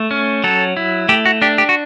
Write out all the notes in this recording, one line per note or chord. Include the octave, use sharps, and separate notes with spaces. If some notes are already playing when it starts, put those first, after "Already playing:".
Already playing: A3
C#4
F#3 A4
E4
A3 G4
F#4
D4 G4
G4
F#4